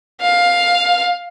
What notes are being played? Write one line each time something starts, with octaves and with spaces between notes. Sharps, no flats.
F5